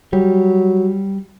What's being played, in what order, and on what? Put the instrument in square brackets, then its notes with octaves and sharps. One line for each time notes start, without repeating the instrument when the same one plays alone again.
[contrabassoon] F#3 [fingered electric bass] G3